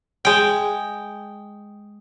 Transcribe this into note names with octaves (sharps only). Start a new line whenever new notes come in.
G#3 G5